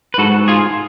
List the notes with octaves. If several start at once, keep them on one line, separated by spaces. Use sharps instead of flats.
B4
G#2 F#4 A4
F4 G#4